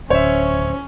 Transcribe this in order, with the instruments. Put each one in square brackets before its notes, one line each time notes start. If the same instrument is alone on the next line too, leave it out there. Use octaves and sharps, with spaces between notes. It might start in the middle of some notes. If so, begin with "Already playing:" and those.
[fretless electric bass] D1 [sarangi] C#4 [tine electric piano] C5 [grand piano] C#5 E5